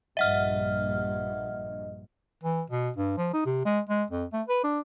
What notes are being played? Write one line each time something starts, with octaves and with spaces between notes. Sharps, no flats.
A#1 G2 D#5 E5 F#5 F6
E3
B2
G2
F3
D#4
C3
G#3
G#3
F2
A3
B4
D4